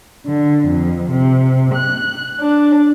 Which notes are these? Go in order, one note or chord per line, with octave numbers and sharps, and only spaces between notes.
D3
F2
C3
F#6
D4